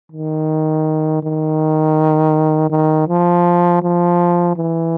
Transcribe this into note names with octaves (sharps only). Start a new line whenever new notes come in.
D#3
D#3
D#3
F3
F3
E3